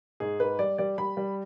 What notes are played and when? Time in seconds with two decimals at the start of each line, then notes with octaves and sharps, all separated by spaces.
0.20 G#2 G#4
0.40 G#2 B4
0.59 G3 D5
0.78 G3 D5
0.98 G3 B5
1.17 G3